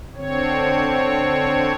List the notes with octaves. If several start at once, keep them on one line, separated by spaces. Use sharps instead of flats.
D3 C4 C#5